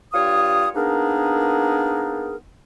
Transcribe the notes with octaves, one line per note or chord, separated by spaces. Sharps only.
G2 F4 C#5 D#6
A#3 B3 D4 D#4 G#4 A#4